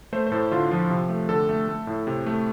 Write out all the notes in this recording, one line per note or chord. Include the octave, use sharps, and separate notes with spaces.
A3 C5
C5
A2 A4
D3 F4
F3
C3
A3
D3 A4
A3
A3
A2
C3
A3